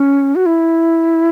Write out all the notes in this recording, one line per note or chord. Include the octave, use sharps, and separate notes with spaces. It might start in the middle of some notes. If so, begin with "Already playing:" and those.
Already playing: C#4
F#4
E4